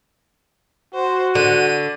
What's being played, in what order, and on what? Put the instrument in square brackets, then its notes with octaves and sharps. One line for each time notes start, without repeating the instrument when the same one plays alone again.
[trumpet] F#4 [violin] C5
[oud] D3 [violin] D#7